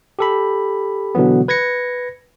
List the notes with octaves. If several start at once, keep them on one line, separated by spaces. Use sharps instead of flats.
G4 A4 B5
B2 D3 E3 F#3 B3
B4 G#6 A#6 C#7